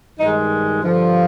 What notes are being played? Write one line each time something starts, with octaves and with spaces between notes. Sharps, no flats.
G2 D#3 G#3 D#4
G2 D3 F3